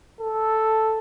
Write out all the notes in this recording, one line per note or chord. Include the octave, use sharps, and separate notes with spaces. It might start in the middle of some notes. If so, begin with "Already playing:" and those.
A4